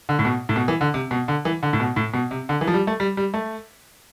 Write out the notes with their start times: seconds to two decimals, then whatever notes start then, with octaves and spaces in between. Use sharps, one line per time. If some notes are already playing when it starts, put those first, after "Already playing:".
0.09 D3
0.19 A2
0.25 B2
0.49 A2
0.56 B2
0.68 E3
0.81 D3
0.94 C3
1.11 B2
1.28 D3
1.45 E3
1.63 D3
1.73 A2
1.80 B2
1.96 A2
2.14 B2
2.31 C3
2.49 D3
2.61 E3
2.67 F3
2.74 G3
2.87 A3
3.00 G3
3.17 G3
3.34 A3